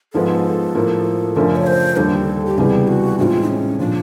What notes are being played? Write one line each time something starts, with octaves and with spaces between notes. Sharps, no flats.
G#2 F3 G#3 B3 A4
A2 F3 A#3
F#2 C#3 F3 A3 D4 A#4
C#5
C5
D#2 D3 G3 A4
G4
C#2 C3 E3 G3 B3 G#4
F#4
A2 E3 G#3 C4 D#4 F4 F#4
C#4
A#2 F3 D4